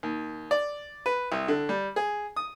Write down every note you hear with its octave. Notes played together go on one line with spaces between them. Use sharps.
D#2
D5
B4
C2
D3
G3
G#4
D#6